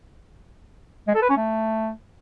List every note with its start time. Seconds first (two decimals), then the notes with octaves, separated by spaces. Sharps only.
1.07 G#3
1.15 A4
1.22 B4
1.30 C#4
1.37 A3